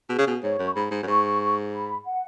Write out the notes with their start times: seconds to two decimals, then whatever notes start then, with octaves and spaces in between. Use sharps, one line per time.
0.09 B2 G#4
0.18 C#3
0.27 B2
0.43 G#2 C#5
0.59 F#2
0.66 C#6
0.75 G#2 B5
0.91 G#2
1.03 F#2
1.07 G#2 C#6
1.73 B5
2.05 F#5